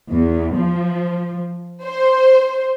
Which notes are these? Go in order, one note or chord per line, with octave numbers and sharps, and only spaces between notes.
E2
F3
C5